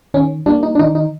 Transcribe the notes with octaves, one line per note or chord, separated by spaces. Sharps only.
D#3 C#4
G3 A#3 D4
D#4
D4
D#3 D#4
D#4